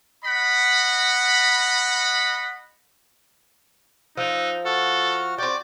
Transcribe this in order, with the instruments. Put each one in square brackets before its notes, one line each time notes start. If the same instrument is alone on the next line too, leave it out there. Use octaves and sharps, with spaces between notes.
[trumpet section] D#5 F#5 B5
[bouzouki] F3 [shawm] D#4 [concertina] E6 F#6
[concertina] F#4 F#5 F6 [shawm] A4
[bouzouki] C4 G5 [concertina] F#4 [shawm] D5